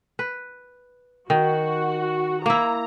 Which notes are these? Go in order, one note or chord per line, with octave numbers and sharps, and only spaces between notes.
B4
D#3 F#4
A#3 E4 A#5